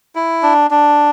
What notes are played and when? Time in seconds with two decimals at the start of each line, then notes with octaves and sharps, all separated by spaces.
0.15 E4
0.43 D4
0.71 D4